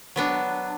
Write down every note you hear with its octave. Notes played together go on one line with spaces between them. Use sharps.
F#3 B3 D4